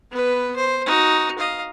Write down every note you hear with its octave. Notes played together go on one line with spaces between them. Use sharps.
B3 B4
C5
D#4 F#4
D#5 F5